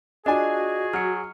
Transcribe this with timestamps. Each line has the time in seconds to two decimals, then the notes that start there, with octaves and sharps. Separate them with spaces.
0.26 D4 F4 F#4 G#4 D#5 G#5
0.93 F#3 F6 C#7